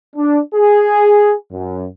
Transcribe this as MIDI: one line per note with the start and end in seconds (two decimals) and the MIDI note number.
0.15 0.39 62
0.54 1.33 68
1.51 1.86 42